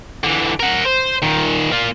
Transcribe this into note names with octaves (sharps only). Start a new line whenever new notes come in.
D3 E3
A#4 F#5
C5
A#2 D#3
A#3 F4